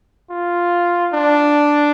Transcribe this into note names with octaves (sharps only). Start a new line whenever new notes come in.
F4
D4